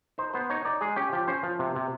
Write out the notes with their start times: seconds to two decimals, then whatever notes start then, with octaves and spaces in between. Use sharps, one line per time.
0.18 D#4 C5
0.34 B3 C5
0.50 D#4 C#5
0.65 D#4 D5
0.81 G#3 G#4
0.96 C#4 G4
1.13 F3 G4
1.28 C#4 C5
1.43 F3
1.59 C3
1.76 C3